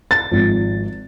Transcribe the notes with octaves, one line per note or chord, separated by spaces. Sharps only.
A6
G#1 G#2 F3